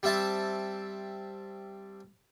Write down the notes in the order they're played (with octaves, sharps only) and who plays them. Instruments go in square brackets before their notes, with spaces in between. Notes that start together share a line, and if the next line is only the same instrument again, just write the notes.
[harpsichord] G3 C4 E5 A5